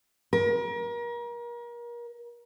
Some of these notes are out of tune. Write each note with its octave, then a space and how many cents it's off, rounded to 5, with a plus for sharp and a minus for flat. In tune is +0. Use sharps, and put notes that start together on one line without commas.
A#4 +35